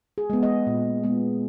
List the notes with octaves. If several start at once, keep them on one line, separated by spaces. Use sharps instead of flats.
G#4
G#3 B3
D#5
A#2
G#3 B3